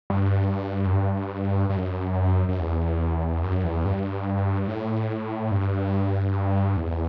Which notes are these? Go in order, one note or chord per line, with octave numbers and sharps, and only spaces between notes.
G2
F#2
G2
G2
F#2
F#2
E2
F#2
E2
G2
A2
G2
E2